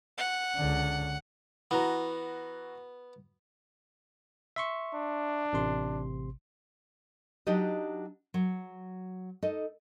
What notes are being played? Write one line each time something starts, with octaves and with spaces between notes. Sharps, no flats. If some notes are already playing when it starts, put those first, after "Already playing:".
F#5
C#2 D3
E3 B3 F#4 A#5
E5 C6 C#6
D4
A1 C3 C6
F#3 D4 D#4 G4 D#5
F#3
D#4 A4 D#5